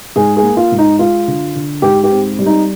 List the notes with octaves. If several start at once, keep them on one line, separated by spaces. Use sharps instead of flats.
G#2 G#4
G#4
A#3
F4
G#2
D#4
G#3 F4
D3
D3
G#2 G4
G4
C4
G3
D#4